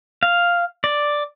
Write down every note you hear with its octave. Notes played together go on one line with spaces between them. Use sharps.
F5
D5